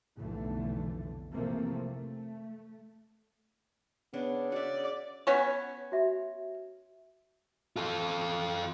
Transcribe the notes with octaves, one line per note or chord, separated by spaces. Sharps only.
F1 B1 D3 E3 A3
C3 E3 F3 A3 A#3 C4
A3
C#3 B3 D4
C#3 F#4 D5 E5
B3 C#4 C#5
F#4 E5
F4 A4